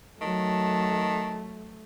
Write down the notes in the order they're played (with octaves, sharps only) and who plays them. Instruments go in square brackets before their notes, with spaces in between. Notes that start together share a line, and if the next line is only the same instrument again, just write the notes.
[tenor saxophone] D#3 [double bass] F#3 [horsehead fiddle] A3 [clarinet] A5